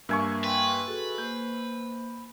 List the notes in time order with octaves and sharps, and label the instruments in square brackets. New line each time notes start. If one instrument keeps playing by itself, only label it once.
[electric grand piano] G2 A#3 [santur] E5 G#5 C#6
[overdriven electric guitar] B4 [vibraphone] G5 C6
[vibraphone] F#4 G#4 A4
[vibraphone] A#3 C5 [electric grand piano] G6